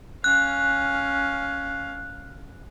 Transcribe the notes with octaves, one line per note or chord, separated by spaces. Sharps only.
C#4 F5 F#6